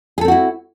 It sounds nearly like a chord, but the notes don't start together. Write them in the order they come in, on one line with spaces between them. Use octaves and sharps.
G#4 A4 C4 F#4 E4